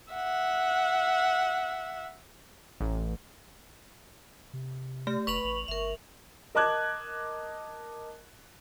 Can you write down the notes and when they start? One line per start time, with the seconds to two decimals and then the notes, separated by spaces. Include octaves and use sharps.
0.14 E5 F#5
2.81 A1
4.53 C3
5.07 A3 G4
5.27 F1 B4 B5 C#6 F7 F#7
5.44 A1
5.68 G1 A#4 E5
6.55 A#4 D#5 A5 D6 F#6 G#6